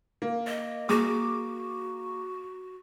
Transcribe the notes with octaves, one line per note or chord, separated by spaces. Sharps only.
A#3
D#5
A#3 F#4 G#4 A#4 D6